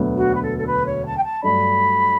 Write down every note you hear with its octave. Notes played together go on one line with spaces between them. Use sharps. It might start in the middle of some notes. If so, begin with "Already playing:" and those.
Already playing: E1 D2 D3 F#3 B3
F#4
B4
A4
A4
B4
C#5
A5
G5
A5
G2 F#3 A3 D4 B5